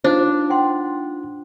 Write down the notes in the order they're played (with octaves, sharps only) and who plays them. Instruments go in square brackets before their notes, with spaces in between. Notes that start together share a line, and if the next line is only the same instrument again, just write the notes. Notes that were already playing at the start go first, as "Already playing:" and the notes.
[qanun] D4 [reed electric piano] D#4 F4 [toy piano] C5
[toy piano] F#5 G5 C6